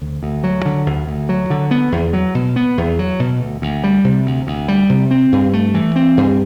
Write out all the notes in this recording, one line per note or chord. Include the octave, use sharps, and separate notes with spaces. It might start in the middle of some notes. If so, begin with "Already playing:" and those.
D2
D2
F#3
D3
D2
D2
F#3
D3
B3
E2
F#3
B2
B3
E2
F#3
B2
D2
D2
G3
C3
D2
D2
G3
C3
C4
G2
A3
E3
C4
G2